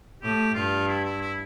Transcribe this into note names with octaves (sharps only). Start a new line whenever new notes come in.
A2 G4
G2 F4
E4
E4
E4